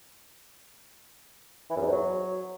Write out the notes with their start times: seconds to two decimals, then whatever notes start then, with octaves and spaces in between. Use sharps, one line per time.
1.70 E3
1.76 F#2
1.81 E2
1.87 G#2
1.92 F#3